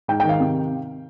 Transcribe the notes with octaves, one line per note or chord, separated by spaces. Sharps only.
G#2 G5
D#3 G5
F5
C3